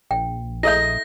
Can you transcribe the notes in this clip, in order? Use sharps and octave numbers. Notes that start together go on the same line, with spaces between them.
A#1 G5
E4 A4 D#5 E5 G6 A#6